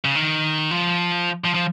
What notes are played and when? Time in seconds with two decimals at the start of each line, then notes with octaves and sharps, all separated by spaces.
0.05 C#3
0.15 D#3
0.71 F3
1.44 F3
1.55 F3